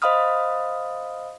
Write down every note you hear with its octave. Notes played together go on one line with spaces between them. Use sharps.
C5 D#5 F5 B5 D#6 F6